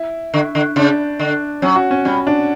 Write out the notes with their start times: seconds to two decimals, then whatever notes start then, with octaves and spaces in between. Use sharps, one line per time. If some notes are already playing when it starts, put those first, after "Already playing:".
Already playing: E4
0.34 D3
0.55 D3
0.76 C#3 D4
1.19 D3
1.62 F#3 C#4
1.76 F#4
1.91 C#4
2.05 G3 C#4
2.27 D4